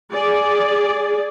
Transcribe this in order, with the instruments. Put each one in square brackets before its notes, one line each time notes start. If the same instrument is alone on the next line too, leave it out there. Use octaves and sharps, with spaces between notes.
[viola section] G#4 D5